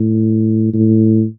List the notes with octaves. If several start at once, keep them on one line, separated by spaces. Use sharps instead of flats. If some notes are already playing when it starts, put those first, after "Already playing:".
Already playing: A2
A2